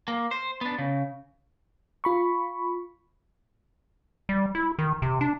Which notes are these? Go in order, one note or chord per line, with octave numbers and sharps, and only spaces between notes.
A#3
C5
B3 D4
C#3
F4 B5 C#6
G3
E4
D#3
C3
D4